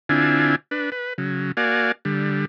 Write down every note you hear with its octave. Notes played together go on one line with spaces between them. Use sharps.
D3 C4 D4 E4 F4 G#5
D4 B4
B4
C#3 F#3
A#3 F#4 D5 F5 G#5
D3 G3